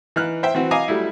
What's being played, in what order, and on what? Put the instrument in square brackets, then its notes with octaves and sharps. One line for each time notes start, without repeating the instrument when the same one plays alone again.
[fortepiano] E3 D#4 F6 F#6
C5 E5 G5
E3 C4 F#4
D#5 F5 G#5 A#5 D6 D#6
F#3 G3 A3 E4